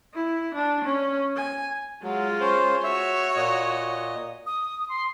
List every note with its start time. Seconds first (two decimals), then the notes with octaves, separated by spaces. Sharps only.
0.14 E4
0.55 D4
0.85 C#4
1.37 G#5
2.03 F#3 G#3 F4
2.41 C#4 C5
2.84 F#4 C#5 E5
3.36 A#2 D#5
4.46 D#6
4.89 C6